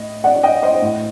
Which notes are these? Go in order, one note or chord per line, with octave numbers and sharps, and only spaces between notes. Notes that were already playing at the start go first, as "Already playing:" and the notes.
Already playing: A2 D#5
D5 F#5
D#5 G5
C5 D#5
A2